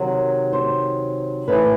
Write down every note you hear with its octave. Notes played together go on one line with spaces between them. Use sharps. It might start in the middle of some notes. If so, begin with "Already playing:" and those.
Already playing: C3 D#3 F#3
C5
A2 E3 B4